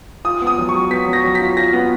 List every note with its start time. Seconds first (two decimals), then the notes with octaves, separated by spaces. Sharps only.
0.25 F4 D#6
0.42 B3
0.47 D#6
0.58 F#3
0.69 C#6
0.74 F#3
0.91 B3 B6
1.08 F#3
1.13 A#6
1.24 F#3
1.35 B6
1.40 F4
1.57 F4 A#6
1.73 B3